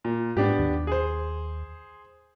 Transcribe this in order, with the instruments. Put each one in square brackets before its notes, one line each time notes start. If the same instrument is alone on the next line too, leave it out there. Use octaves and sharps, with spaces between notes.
[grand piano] A#2
[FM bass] G#2 [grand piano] B3 D4 G4
[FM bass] D#2
[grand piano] G#4 C5